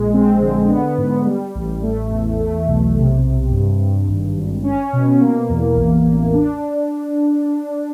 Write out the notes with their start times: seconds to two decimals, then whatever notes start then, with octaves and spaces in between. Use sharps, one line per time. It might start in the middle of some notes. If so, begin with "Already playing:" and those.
Already playing: A#1 G#3
0.13 C4
0.41 D3
0.69 B3
0.98 G#2
1.25 G3
1.55 A1
1.83 A3
2.11 E2
2.39 A3
2.67 B1
2.95 C3
3.23 C3
3.51 G2
3.79 G2
4.07 G#1
4.37 G#1
4.64 C#4
4.93 B2
5.20 A#3
5.49 E2
5.76 A1
6.05 A1
6.34 D4